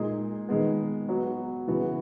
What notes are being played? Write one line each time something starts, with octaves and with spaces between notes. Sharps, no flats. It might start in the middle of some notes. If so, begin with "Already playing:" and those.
Already playing: A#2 G#3 D#4 G#4
D#3 G#3 B3
F#3 B3 F#4
C#3 E3 B3 F#4